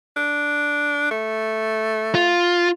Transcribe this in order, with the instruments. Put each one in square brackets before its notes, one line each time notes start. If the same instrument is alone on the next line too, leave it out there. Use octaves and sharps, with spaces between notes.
[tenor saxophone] D4
A3
[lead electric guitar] F4